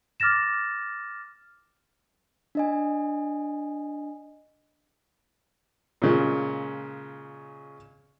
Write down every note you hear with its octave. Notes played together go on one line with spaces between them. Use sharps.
D6 F6 A6 A#6 E7
D4 D#5 G#5
A#2 C#3 G#3